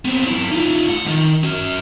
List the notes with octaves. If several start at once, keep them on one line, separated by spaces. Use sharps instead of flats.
B3 C4
F#3 E4
D#4 F4
A2 F#5
E2 D#3
C#4 F#4